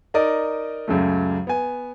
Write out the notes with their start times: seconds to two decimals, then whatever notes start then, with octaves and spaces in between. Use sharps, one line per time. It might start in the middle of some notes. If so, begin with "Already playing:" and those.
0.14 D#4 A#4 D5 D#5
0.88 C#2 F#2 F#3 A3
1.47 B3 G#5